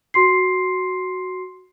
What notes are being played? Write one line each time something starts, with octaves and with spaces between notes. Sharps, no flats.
F#4 C6 C7